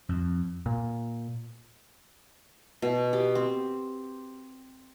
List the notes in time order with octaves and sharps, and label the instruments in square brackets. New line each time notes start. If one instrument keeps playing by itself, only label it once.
[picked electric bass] F2
A#2
[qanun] B2
G4
C4